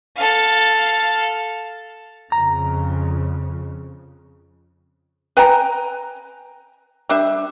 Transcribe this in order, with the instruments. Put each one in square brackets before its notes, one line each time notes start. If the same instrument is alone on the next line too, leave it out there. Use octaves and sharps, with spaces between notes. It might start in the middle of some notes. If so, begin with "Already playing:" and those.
[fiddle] A4 F5
[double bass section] F2 C#3 [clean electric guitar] A#5
[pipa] B4 G5 G#5 A#5
G3 D4 E5